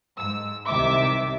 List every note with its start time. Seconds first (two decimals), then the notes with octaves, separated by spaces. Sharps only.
0.18 G#2 E6
0.67 C2 C3 D#3 E5 D6